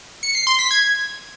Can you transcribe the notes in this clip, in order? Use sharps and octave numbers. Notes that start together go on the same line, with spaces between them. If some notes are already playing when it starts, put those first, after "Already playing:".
C#7
C7
C6
B6
G#6